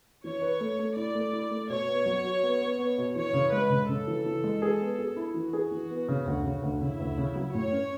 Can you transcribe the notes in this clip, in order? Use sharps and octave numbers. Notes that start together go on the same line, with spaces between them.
E3 C#5
B4
A3
A3
E4 D5
A3
E4
A3
B2 C#5
B3
F#3
F#4
B3
B3
B3
B2
E3 C#5
C#3
G#3 B4
C#3
C#3 A4
E3
E3
G#3
G#4
B3
G#4
E4
E3 F#4
G#4
E3
B3
C#3
D2
C#3
D2
C#3 E4
D2
C#3
F#3
A2 C#5
C#4